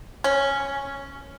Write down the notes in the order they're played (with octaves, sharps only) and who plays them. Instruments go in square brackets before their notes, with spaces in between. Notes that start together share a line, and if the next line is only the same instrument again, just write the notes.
[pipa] C#4